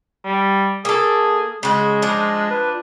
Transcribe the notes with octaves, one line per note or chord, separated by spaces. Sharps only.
G3
A#3 G#4 A4
C#3 G#3 F#4
F3 D4
B4